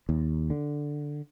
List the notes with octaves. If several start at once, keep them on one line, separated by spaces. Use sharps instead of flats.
D#2
D3